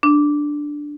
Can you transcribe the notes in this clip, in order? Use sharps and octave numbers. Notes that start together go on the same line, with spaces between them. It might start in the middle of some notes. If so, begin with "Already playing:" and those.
D4